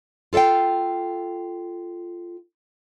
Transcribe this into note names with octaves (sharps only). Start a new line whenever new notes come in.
F4 A4 D5 F5 G5